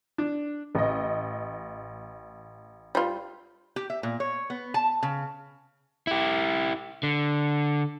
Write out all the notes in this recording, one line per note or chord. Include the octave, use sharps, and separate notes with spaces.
D4
A1 D#5
G3 F4
G4
E5
A#2
C#5
B3
A5
C#3
E4 G4
D3